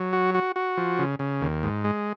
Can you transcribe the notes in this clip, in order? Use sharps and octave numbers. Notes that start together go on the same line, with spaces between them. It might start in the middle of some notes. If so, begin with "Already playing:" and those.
Already playing: F#3
F#4
F#4
F#4
F3
C#3
C#3
D#2
G#2
G#3